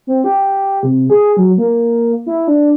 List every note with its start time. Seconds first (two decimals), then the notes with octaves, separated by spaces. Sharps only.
0.07 C4
0.24 G4
0.83 C3
1.10 G#4
1.37 F#3
1.58 A#3
2.26 E4
2.48 D4